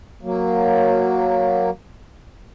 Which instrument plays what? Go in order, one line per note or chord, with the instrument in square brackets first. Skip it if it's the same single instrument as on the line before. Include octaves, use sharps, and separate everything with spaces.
[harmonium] F#3 A#3